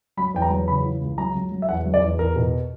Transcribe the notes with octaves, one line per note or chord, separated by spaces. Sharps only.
F#3 B5
E2 G5
A#5
F#3
C#3 B5
E3
C#2
F#3 A#5
F#3
F#3
E5
E2 F#5
F#3
D5
E2
E2 A#4
B2